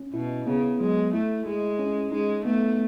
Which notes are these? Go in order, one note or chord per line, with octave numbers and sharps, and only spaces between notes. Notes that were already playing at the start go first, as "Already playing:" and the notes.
Already playing: C#4
B2 E4
C#3 B3
F#3 G#3
A3 E4
G#3 E4
C#4
G#3 D#4
A3 B3